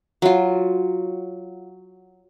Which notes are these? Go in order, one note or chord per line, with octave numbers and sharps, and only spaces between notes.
F#3 F4